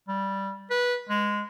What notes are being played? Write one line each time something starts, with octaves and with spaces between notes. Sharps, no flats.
G3
B4
G#3